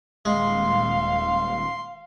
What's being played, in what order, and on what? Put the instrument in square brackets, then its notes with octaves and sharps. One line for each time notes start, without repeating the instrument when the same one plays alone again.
[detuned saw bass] D#1 [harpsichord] G#3 [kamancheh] F5 [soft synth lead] C6